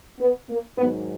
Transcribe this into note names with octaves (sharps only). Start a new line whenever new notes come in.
B3
A#3
G#2 D#3 F#3 B3